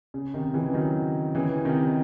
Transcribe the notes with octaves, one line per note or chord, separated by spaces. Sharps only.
C#3
C3 D#3
C#3 E3
D#3 F#3
C#3 E3
C3 D#3